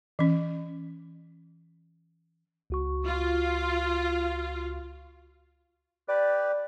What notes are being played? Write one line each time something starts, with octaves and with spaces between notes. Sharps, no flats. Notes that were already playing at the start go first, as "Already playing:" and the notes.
E3 C#4
C#2 F#4 C#6
F4
G4 B4 D5